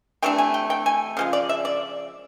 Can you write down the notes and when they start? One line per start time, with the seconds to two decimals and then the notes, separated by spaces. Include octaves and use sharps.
0.22 C3 E3 A3 D4 G5
0.38 G#5
0.54 G5
0.70 G5
0.86 G#5
1.17 C#3 F3 G#3
1.33 D5
1.49 E5
1.65 D5